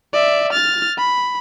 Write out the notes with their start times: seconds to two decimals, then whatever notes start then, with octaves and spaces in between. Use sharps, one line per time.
0.13 D5 E5
0.53 F6 A6
0.98 B5